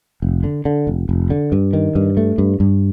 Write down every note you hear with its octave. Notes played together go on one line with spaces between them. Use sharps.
F1
D3
D3
F1
F1
D3
G2
D#3
G2
A3
G2
G2